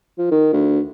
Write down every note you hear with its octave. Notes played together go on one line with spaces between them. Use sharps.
F3
D#3
D2